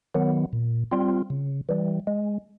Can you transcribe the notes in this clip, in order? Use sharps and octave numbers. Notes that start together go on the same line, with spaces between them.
D#3 F#3 B3
A#2
G3 C4 F4
C#3
E3 G3
G#3